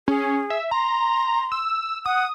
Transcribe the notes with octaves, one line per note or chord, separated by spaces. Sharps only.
C#4 G#4
E5
A#5 C6
E6
F#5 D#6